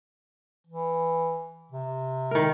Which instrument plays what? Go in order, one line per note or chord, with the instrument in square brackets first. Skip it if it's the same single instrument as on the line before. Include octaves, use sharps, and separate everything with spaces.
[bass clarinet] E3
C3
[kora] D#3 A#4